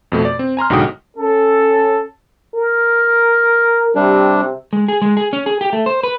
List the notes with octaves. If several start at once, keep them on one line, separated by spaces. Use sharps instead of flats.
F2 B2 A3
D5
C4
G#5 A#5 C6 F6
B1 G#2 D3 F#4 G5 D#6
C#4 A4
A#4
C3 G3 D4
G#3
G#4
G#3
G#4
C#4
G#4
G4
A3
C5
B4